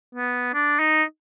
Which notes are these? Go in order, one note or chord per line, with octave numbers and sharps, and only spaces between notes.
B3
D4
D#4